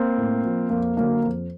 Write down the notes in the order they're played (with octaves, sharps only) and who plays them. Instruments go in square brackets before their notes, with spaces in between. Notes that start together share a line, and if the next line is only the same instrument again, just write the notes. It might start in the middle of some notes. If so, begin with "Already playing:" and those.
Already playing: [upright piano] A#3 C4
A2
F3
F2 A#3
D3 F#3 A#3
F2